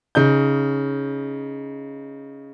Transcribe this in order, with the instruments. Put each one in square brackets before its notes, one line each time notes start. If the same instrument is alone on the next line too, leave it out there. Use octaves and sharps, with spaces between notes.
[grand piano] C#3 D#4 G6